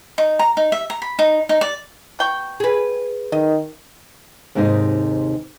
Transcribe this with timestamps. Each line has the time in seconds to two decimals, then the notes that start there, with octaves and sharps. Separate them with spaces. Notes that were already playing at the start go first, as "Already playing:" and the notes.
0.18 D#4
0.39 A#5
0.57 D#4
0.72 E5
0.90 A#5
1.02 B5
1.19 D#4
1.49 D#4
1.61 D5
2.19 B2 G5 C#6
2.60 G#4 B4
3.32 D#3 D#5
4.55 D#2 G#2 C3 D#4 C5 D#5